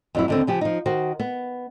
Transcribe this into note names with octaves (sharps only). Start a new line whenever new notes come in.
F2 F#3 E4
D#2 D3 C4
C#3 F3 G4
F3 D#4
D#3 F#4 C5
B3